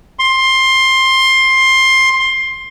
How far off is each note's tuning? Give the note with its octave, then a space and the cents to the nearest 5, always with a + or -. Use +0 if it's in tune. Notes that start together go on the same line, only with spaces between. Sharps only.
C6 +15